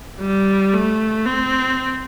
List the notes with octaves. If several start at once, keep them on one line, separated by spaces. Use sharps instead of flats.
G3
A3
C4